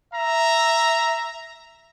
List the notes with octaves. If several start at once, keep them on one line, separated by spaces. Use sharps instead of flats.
E5 A#5